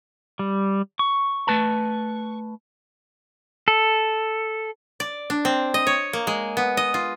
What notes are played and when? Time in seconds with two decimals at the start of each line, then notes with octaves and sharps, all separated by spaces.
0.39 G3
0.99 C#6
1.47 A3 B4 A5
3.68 A4
5.00 D5
5.30 D4
5.45 C4
5.74 D#5
5.87 C#5
6.13 A#3
6.27 G#3
6.57 B3
6.77 D#5
6.94 F4